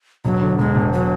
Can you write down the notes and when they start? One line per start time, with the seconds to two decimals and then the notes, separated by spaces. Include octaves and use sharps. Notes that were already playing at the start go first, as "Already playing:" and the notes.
0.25 E1 F#3
0.42 D3
0.59 E1 G#3
0.76 E1
0.93 F#3